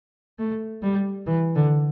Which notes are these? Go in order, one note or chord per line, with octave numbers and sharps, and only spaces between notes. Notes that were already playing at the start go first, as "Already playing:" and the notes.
A3
G3
E3
D3